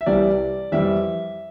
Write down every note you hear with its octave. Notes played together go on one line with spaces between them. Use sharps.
E5
C2 C3 E3 G3 D5
F2 E3 G3 E5